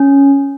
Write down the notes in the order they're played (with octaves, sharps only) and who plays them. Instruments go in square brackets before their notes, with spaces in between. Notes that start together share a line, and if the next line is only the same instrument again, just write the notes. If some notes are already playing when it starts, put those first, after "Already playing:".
Already playing: [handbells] C#4